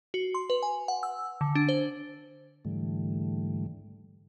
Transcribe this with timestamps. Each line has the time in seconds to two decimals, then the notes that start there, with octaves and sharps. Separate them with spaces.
0.14 F#4
0.34 C6
0.50 B4
0.63 G#5
0.88 F#5
1.03 E6
1.41 D3
1.55 D4
1.69 C5
2.65 G#2 D3 E3 G3 A3